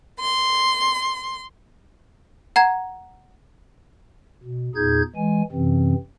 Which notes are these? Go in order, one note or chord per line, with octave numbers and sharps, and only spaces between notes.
C6
F#5 A#5 G#6
B2
E2 A#2 D#4 G#4 G6 G#6
E3 G#3 G#5
F#2 C3 E3 C4